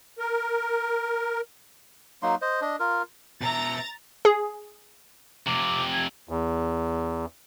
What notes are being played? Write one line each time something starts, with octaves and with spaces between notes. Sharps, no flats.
A#4
F#3 A#3 D#4 C6
C5 D#5
D4 D#5
F4 A#4
B2 E5 A#5 A6
G#4
F2 C3 D6
G#5
E2